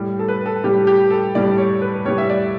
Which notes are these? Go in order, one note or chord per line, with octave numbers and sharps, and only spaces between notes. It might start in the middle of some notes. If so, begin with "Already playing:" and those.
Already playing: A2 G3
A4
B4
A4
A2 G3 G4
G4
A4
A2 G3 D5
C#5
B4
A2 G3 C#5
E5
D5